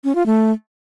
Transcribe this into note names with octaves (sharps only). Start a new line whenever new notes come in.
C#4
F4
A3